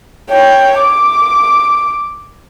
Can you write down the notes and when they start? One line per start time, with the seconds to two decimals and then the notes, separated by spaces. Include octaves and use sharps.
0.30 C#5 G5
0.79 D6